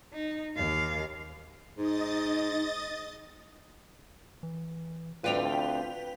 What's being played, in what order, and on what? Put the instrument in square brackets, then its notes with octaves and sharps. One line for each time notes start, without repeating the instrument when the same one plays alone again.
[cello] D#4
D#2 F5
[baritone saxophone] G#2 [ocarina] D#4 [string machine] D#5 D#6 A6
[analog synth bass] E3
[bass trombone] D2 [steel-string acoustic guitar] C4 D5 F5 [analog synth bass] F4 [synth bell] B4 G5 F7